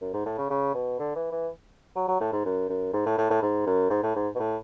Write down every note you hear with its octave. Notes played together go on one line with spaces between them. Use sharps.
F#2
G#2
A2
C#3
C#3
B2
D3
E3
E3
F#3
F#3
A2
G#2
F#2
F#2
G#2
A2
A2
A2
G#2
F#2
G#2
A2
G#2
B2
A2